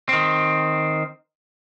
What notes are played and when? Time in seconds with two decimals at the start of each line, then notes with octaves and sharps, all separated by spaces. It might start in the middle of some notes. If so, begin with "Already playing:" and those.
0.09 D#3 C4